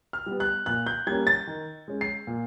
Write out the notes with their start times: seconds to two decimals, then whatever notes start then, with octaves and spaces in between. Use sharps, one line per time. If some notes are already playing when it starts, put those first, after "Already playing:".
0.13 F6
0.26 G3 B3
0.40 F#6
0.66 A#2 F#6
0.86 G6
1.07 G3 A#3 C#4 G#6
1.27 A6
1.47 D#3
1.88 G#3 C#4
2.01 C7
2.27 A#2